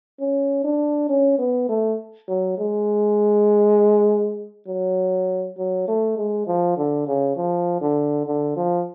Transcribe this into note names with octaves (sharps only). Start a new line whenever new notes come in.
C#4
D4
C#4
B3
A3
F#3
G#3
F#3
F#3
A3
G#3
F3
D3
C#3
F3
D3
D3
F3